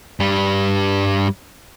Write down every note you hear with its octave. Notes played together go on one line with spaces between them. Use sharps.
G2 G3